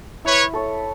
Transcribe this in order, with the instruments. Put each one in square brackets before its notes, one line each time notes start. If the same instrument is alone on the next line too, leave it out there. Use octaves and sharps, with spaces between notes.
[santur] E4 [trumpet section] B4 C#5
[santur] A4 C#5